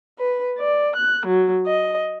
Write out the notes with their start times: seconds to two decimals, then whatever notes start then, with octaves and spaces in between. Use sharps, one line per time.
0.18 B4
0.58 D5
0.96 F#6
1.26 F#3
1.65 D#5